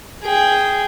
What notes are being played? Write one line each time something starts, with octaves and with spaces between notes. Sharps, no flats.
G#4 G5